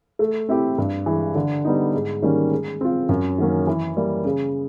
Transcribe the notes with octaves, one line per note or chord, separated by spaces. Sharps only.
A3
C4 E4 G4
G2
E3 G#3
D3
G3 B3 D#4
G#2
D#3 G3 A#3 C#4
G#3
C4 F4
F#2
D#3 F#3 A#3 C#4
E3
G3 A#3
C#3